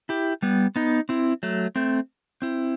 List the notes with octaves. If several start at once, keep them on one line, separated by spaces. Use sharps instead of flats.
E4 G4
G3 B3
B3 D#4
C4 E4
F#3 A3
A3 C4
C4 E4